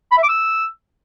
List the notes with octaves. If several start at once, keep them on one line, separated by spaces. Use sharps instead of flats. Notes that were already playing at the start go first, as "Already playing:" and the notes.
B5
E5
D6
E6